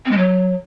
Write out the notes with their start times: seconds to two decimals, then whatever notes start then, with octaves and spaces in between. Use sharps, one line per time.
0.05 C4
0.11 G#3
0.17 F#3